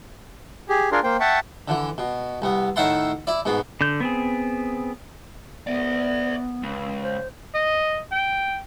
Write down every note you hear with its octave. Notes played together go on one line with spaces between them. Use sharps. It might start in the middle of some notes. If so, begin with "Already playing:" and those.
G4 G#4
D4 F4 G#4 A#4 C6
A#3 C5 G5
E5 F#5 G5 A5 C#6
D3 E3
B2
C2 B3
A2 D#3 E5 F#5 A5 C6
E4 D5
G#2 B2 B3
D3 G6
B3 C4 G#4
B3 D5 E5
C#2
C5
D#5
G5